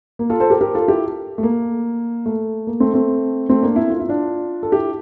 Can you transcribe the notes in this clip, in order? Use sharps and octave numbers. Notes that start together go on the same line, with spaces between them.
A#3
F4 A4
A4 C5
G4 A#4
G4 A#4
F4 A4
E4 G4
A3
A#3
A3
A#3
A3 C4
A3 C4
A3 C4
A#3 D4
C4 E4
F4
E4
D4 F4
A4
E4 G4